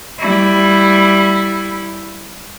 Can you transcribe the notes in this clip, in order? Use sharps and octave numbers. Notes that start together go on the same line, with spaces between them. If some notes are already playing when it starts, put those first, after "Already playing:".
G3 E4